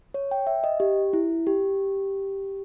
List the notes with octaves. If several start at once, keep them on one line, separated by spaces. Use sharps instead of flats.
C#5
G5
E5
D#5
G4
E4
G4